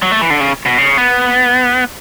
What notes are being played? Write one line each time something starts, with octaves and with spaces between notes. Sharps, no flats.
F#3
A3
E3
D3
C#3
B2
C#3
B3